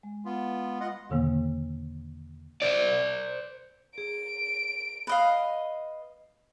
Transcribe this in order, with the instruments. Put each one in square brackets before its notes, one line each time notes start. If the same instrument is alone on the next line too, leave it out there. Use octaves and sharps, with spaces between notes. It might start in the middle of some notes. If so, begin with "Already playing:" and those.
[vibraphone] G#3
[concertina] B3 F4
F4 D#5 F#5
[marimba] E2 B2 D3 D#3 A#3
[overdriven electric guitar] C5 D5
[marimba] G#4 [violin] D7
[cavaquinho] B4 D#5 F5